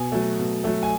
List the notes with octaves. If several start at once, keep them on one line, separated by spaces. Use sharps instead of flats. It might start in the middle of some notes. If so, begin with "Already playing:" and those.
Already playing: B2 G#5
F#3 A3
B2
F#3 A3
G#5